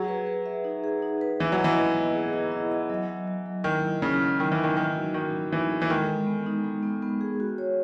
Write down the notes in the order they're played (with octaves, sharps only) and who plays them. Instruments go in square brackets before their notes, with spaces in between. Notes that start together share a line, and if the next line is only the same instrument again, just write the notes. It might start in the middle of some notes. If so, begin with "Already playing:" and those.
Already playing: [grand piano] F#3 [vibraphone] G#4
[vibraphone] B4
B4
E5
D#4
G#4
D#4
B4
[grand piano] E3 [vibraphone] E4
[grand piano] F#3
[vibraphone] D#5
[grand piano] E3
[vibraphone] D#5
B3
G#4
E4
D#5
D#5
F#3
F#3
F#3
F#3
[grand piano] D#3 [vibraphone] E4
[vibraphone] E4
[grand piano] C#3 [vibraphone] E4
[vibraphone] F#3
[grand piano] D#3 [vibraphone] D#4
[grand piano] E3
[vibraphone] D#4
[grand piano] D#3
[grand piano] D#3 [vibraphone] D#4
[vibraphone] F#4
[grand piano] D#3 [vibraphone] D#4
[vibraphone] D#4
[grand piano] E3 [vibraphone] D#4
[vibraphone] A4
[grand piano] E3
[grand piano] D#3 [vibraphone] G#3
[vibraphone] G#3
B3
D#4
G#3
B3
B3
G#4
F#4
C#5